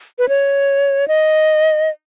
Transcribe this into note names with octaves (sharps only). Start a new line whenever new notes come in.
B4
C#5
D#5